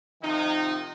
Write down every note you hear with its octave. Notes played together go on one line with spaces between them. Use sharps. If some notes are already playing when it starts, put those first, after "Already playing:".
C3 D#3 F3 D#4